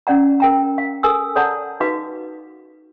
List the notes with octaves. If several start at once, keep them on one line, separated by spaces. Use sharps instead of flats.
C#4 D5 F#5 A#5
A#4 G5 A#5
F5
A4 A#4 G#5 E6
A4 C#5 D5 F#5 A5 A#5
D#4 F#4 B4 F5 D6